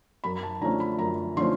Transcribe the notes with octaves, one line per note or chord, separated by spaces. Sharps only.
F#2 B5
A5
D3 F3 A3 C#4 A#5
B5
F#2 A#5
D3 F3 A3 C#4 C6